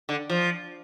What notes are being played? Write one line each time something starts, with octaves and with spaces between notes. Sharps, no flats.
D3
F3